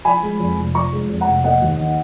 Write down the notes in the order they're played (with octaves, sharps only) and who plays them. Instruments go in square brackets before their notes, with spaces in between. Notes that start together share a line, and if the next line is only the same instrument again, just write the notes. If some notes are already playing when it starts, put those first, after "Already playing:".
[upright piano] F3 G#5 B5
G#3
F2
F1
F3 A#5 C#6
G#3
F2
F#5 A#5
F1
A#3 D#5 F#5
D#2
D#3